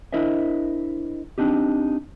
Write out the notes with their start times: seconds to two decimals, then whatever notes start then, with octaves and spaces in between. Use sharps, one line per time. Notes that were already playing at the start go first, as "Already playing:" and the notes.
0.13 D4 E4 A#4 C5 D#5 E5
1.38 C4 D4 D#4 G4